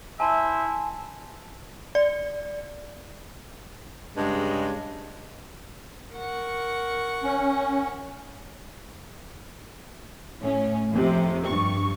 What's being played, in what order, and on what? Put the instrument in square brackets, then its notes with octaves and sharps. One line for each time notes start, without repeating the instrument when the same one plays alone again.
[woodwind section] E4 C5 E5 [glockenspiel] G#5 A5
[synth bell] D5
[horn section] G2 C#3 G#3
[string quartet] A#4 F#5 C#6
[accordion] C#4
[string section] A2 C#4
F2 C3
G2 C#6